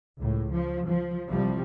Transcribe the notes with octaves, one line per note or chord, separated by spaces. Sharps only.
C#2 A2
F3
F3
C2 C3 F3 G3